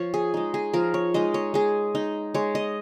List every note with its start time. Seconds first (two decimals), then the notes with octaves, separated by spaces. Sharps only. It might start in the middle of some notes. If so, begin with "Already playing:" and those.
Already playing: F3 C#5
0.14 G#4
0.34 G#3 D#4
0.54 G#4
0.74 F3 A#4
0.94 C#5
1.14 G#3 D#4 D#5
1.34 C#5
1.54 G#3 G#4
1.95 D#4
2.34 G#3 C#5
2.55 D#5